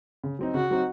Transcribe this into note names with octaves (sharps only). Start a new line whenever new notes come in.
C#3
F#3 C4 D#4
C#3 F#4
F#3 C4 D#4